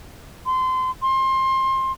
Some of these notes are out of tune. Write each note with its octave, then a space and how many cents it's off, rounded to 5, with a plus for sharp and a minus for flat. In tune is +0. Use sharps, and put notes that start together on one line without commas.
C6 -25
C6 +25